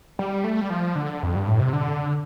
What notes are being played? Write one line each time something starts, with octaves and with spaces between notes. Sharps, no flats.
G3
A3
G3
F3
D3
F2
G2
A2
C3
D3